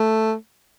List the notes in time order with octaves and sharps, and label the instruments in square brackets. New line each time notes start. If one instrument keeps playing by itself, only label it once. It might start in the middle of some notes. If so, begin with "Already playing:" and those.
Already playing: [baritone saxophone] A3